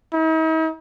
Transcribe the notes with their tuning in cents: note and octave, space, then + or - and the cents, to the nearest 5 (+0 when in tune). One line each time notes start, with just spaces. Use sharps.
D#4 +45